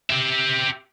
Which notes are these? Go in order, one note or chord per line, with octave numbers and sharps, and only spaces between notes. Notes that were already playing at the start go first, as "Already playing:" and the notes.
G4 E5